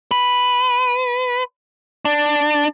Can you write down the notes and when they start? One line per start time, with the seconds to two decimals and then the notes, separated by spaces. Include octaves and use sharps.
0.11 B4
2.05 D4